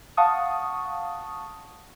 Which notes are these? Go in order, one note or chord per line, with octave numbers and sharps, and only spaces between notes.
F5 F#5 A5 C#6 D#6